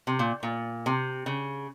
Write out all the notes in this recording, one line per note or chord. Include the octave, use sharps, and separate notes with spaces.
C3
A#2
A#2
C3
C#3